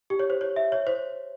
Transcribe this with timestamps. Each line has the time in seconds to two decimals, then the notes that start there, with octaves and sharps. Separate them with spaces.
0.10 G4
0.19 C#5
0.30 C5
0.41 C#5
0.56 E5
0.72 C#5
0.87 C5